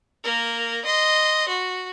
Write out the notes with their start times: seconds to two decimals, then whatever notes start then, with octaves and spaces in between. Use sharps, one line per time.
0.24 A#3 A#4
0.85 D#5 C6
1.48 F#4